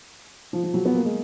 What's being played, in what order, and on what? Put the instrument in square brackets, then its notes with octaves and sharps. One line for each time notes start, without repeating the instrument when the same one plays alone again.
[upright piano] F3
F3
F#3
B3
A#3
G#3